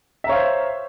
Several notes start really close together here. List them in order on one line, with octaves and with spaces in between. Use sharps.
E5 A#5 C#5 F5 C5